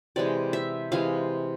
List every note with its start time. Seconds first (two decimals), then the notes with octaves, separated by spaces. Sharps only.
0.16 C3 E3 G#3 D5
0.53 E5
0.92 C3 E3 G#3 F5